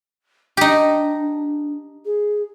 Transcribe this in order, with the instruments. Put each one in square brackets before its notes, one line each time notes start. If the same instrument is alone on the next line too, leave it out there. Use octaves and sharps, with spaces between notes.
[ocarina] D4 [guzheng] D#4 G4
[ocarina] G#4